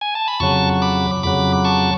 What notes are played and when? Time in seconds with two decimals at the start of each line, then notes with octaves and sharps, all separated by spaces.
0.01 G#5
0.15 A5
0.28 B5
0.40 F2 C#3 F#3 A5 C#6
0.82 B5 D6
1.23 F2 C#3 F#3 B5 D6
1.64 A5 C#6